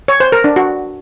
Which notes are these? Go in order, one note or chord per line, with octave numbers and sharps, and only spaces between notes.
C#5
C5
A#4
D4
F#4